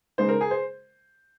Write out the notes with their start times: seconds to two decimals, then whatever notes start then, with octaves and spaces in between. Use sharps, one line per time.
0.18 C#3 G#3 D#4 C5
0.29 A#4
0.41 G#4
0.51 C5